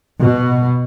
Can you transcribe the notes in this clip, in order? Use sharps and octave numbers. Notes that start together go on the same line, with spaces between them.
B2